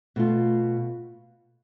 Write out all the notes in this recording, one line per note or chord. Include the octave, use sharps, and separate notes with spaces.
B2 A3 F4